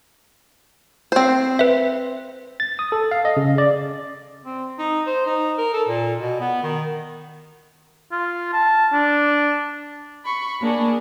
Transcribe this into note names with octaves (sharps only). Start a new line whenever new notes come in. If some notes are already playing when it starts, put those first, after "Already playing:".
C4 C5
B4 E5
A6
D#6
A4
F5
D#5
C#3
D5
C4
D#4
C5
D#4
A#4
A4
A#2
B2
B3
D#3
F4
A5
D4
B5 C#6
A#3 D4 G#4